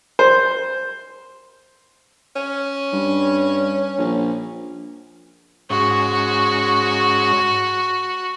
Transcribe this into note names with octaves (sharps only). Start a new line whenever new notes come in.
C5
C#4
G2
A#1
G#2 C#4 F#4